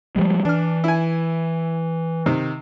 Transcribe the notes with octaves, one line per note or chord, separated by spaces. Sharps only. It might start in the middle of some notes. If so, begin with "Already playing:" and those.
F3 G3 G#3
E3 D4 F6
E4 G#5
C3 D#3